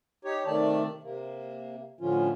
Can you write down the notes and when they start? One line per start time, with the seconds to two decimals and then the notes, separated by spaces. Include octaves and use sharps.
0.25 D#4 G4 C#5
0.47 C3 D#3 A3 D5 A5
1.03 C3 A#3
2.01 A2 D3 F3 C#4 F4